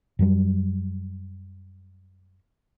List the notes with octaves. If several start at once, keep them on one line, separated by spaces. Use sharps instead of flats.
F#2 F#3 G3